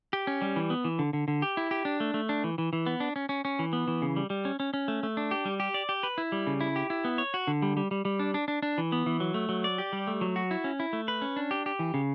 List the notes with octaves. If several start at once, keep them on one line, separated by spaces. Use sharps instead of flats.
G4
C#4
G3
E3
B3
E3
D3
D3
D3
G4
E4
G4
D4
A3
A3
D4
E3
E3
E3
B3
D4
C#4
C#4
C#4
E3
B3
E3
C#3
G3
G3
C#4
C#4
C#4
A3
A3
D4
G4
G3
G4
D5
G4
B4
E4
G3
C#3
E4
G4
E4
B3
C#5
F#4
D3
G3
G3
G3
G3
D4
D4
D4
D4
E3
B3
E3
F#3
A3
F#3
D5
G4
G3
A3
F#3
F#4
E4
C#4
E4
A3
B4
C#4
D4
G4
G4
E3
C#3